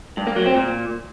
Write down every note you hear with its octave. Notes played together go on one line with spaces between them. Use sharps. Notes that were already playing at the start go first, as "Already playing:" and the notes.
G2
A#3
F#3
C4
A#2